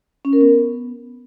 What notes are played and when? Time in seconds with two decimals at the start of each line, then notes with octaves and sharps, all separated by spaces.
0.25 C#4
0.33 A#4
0.41 B3